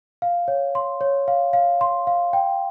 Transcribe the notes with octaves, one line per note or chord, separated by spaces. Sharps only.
F5
C#5
C6
C#5
F5
F5
C6
F5
G5